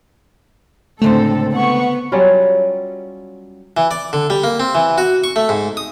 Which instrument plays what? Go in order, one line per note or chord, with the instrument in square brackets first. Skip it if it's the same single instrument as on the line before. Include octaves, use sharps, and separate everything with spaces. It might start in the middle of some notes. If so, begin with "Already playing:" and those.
[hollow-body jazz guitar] C#2 D3 C5 [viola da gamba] A2 [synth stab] A3 [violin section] C4 A4
[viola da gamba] B3 [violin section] F#5 C#6
[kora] F#3 G3 C#4 F4
[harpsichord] E3
D5
D3
G3
A#3
C4
E3
F#4
C#6
A3
G#2
D#6